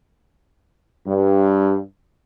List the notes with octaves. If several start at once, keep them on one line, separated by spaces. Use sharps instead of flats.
G2